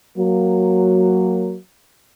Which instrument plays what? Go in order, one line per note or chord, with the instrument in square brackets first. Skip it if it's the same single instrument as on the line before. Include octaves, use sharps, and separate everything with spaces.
[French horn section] F#3 A#3